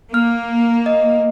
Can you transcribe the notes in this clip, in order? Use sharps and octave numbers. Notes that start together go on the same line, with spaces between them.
A#3 F6
D#5